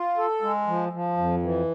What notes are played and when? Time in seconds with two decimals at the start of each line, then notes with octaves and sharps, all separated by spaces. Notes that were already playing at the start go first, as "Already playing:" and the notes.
Already playing: F4
0.18 A4
0.42 G#3
0.67 F3
0.93 F3
1.17 F2
1.43 E3